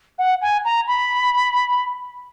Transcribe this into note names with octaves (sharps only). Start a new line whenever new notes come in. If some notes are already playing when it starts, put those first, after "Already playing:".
F#5
G#5
A#5
B5